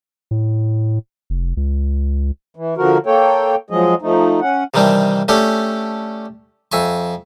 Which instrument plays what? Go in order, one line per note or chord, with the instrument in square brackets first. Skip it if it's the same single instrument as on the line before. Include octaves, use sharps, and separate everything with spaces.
[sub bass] A2
F1
C#2
[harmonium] E3
D3 F3 F#4 A#4
A#3 A4 C#5 G5
F3 F#3 G#3 G#4 D#5
F3 A3 D#4
C#4 F#5
[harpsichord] C3 D#3 E3 G3 D4
A3 C#4 D4 G4 A4
F2 E5 G#5 C#6